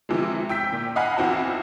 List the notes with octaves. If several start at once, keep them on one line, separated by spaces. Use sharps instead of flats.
C3 E3 F3 G#3
G5 E6 G6 B6
A#2
D#5 F5 F#5 G#5 B5
B1 E3 C4 F#4 A5